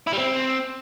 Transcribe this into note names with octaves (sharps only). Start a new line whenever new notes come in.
E4
G3
C4